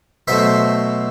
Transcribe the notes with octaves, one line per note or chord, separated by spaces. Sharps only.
B2 F#3 A3 C5 E5